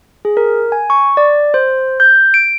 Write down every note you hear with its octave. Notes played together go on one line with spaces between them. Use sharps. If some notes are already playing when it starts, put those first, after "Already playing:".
G#4
A#4
G#5
C#6
D5
C5
G6
D7